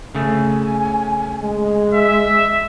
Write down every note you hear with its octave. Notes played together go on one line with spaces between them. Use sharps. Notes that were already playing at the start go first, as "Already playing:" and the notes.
C#3 A3 G#5
G#3
E5